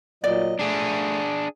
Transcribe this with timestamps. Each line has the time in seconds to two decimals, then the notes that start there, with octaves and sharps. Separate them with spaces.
0.24 A#2 F#3 D5 D#5
0.59 A3 D4 G#4